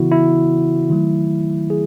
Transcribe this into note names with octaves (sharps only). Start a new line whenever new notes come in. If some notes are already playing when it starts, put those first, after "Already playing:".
Already playing: C#3 E3 B3 E4 F#4
E4
D#3 F#3 A3
G#4